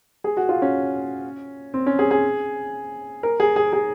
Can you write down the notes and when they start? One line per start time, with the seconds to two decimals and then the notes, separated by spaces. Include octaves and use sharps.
0.24 G#4
0.37 F#4
0.49 F4
0.62 C#4
1.74 C4
1.86 C#4
1.99 G#4
2.11 G#4
3.23 A#4
3.40 G#4
3.56 G#4
3.73 G#4